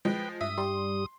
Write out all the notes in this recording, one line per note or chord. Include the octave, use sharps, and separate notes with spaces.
F3 G#3 B4 G5
G2 E5 D#6
G3 C6